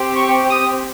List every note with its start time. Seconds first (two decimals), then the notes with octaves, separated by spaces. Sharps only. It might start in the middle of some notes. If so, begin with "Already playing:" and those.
Already playing: C4 G4
0.15 C#6
0.50 D#6